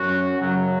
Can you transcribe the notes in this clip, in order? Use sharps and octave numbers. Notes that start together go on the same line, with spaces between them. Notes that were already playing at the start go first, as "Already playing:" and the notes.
Already playing: F#2 F#3 C#4 F#4
F#2 C#3 F#3